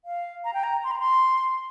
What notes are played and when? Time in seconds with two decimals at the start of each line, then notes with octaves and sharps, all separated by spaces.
0.05 F5
0.45 A#5
0.54 G5
0.63 A#5
0.84 C6
0.91 A#5
0.99 C6